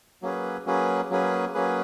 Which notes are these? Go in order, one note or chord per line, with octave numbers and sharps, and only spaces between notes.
F#3 A#3 C#4 G#4 B4
F#3 A#3 C#4 G#4 B4
F#3 A#3 C#4 G#4 B4
F#3 A#3 C#4 G#4 B4